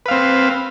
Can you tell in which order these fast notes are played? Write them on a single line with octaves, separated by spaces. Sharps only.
B4 F5 C4